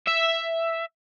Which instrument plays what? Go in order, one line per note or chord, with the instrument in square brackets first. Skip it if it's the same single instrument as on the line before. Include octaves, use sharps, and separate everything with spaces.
[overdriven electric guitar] E5